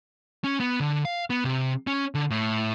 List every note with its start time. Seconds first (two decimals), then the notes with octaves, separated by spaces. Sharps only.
0.44 C#4
0.60 B3
0.80 D3
1.05 F5
1.30 B3
1.44 C3
1.87 C#4
2.15 D3
2.31 A2